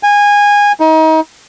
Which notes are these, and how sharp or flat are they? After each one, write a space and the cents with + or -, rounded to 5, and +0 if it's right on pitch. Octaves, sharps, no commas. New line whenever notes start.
G#5 -20
D#4 +30